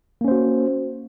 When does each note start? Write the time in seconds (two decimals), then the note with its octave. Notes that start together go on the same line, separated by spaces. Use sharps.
0.21 A#3
0.24 C#4
0.28 C5
0.31 F#4